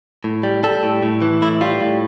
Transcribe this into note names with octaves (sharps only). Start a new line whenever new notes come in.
A2
G3
G3 A4
A2
A2
E3
A2 E4
G3 F4
A2